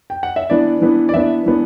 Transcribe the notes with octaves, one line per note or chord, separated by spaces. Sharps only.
G5
F#5
E5
E3 B3 D4 D5
E3 B3 D4
D5
E3 B3 D4 E5
E3 B3 D4